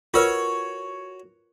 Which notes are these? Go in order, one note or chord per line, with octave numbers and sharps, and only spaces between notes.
F4 F#4 A#4 B4 C#5